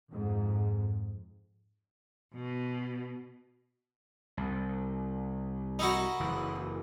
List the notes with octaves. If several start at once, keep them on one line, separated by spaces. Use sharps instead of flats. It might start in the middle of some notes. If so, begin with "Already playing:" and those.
F2 G#2
B2
C2
D#4 E4 F#4
F#1 E3